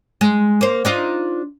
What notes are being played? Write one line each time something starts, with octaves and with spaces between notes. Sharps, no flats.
G#3
A#3 C5
D4 D#4 F4